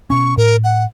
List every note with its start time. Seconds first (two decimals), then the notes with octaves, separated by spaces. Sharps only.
0.10 B2 C#4 C#6
0.37 A2 A#4
0.64 F#5